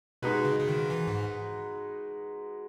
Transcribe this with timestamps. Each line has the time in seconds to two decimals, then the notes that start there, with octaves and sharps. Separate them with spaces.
0.22 B2 G#3 D#4 F#4 B4
0.45 C#3
0.60 C#3
0.68 D#3
0.90 E3
1.07 G#2